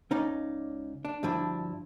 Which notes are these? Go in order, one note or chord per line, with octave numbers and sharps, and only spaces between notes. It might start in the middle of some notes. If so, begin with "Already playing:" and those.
C#2 C#4 D#4 D5
D4
D2 G2 F3 D4 E4